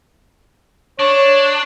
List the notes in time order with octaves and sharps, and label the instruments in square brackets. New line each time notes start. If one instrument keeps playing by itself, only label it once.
[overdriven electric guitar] D4 [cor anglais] C#5